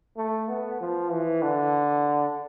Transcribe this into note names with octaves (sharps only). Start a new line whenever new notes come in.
A3
B3
F3
E3
D3